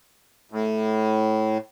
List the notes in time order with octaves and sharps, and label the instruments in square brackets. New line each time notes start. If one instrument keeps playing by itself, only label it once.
[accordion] A2